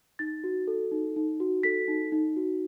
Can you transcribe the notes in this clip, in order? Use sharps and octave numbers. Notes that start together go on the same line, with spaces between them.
D#4 A6
F#4
A4
D#4
D#4
F#4
A4 B6
D#4
D#4
F#4